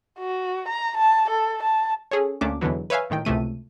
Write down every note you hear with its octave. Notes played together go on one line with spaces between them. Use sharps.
F#4
A#5
A5
A4
A5
C#4 G#4 A4 C#5
D2 A3 A#3 C#4 D4 D6
E2 B2 D3 E3 F#3
B4 C#5 E5 F5 G#5
A#1 A2 D#3 G5
C#2 A2 C3 A3 D#7